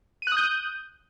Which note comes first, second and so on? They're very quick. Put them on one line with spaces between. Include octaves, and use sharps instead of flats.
D#7 F#6 D#6 G6